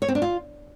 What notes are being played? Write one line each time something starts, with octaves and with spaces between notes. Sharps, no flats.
C#5
C4
D4
F4